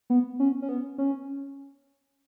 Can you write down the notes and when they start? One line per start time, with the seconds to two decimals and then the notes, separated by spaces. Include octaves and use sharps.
0.10 B3
0.40 C#4
0.62 C#4
0.69 B3
0.98 C#4